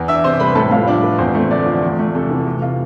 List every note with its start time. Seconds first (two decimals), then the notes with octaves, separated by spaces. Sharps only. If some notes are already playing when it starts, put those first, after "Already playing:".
Already playing: E2 B3
0.08 D4 E5 E6
0.24 C3 C5 C6
0.40 G3 B4 B5
0.55 A2 A4 A5
0.71 A2 F4 F5
0.87 F3 D4 D5
1.03 B3 B4
1.19 E2 C4 C5
1.35 A3
1.51 D3 D4 D5
1.66 F3
1.83 E2
1.99 A3
2.15 C3 A4
2.31 E3
2.46 C3
2.62 F4